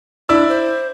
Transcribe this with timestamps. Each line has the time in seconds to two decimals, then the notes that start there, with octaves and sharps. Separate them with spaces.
0.29 D4 E4 D5 E6
0.49 C5